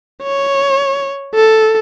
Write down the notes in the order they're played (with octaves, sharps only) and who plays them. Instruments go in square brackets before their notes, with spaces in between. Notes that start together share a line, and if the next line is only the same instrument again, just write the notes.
[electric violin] C#5
A4